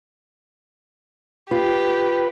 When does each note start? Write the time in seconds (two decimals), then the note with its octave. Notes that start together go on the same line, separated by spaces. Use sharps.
1.51 F4 G4 B4